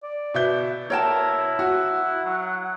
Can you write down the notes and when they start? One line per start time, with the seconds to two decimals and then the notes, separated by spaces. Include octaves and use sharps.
0.03 D5
0.34 B2 E5 G6
0.90 E4 A#4 C#5 G5 A5
1.59 F#4 F#5
2.25 F#3